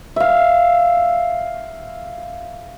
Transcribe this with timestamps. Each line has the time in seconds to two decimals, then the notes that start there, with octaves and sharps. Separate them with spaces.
0.16 E5 F5